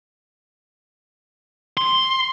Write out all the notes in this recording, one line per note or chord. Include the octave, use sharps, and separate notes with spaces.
C6